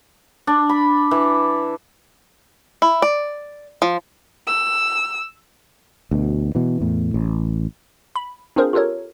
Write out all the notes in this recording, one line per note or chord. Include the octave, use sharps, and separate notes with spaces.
D4
B5
E3
E4
D5
F3
E6
D2 B2
B2 E3
E2 A2
A1
B5
C4 D4 F4 G#4 A#4 C5
F4 G4 A4 A#4 C#5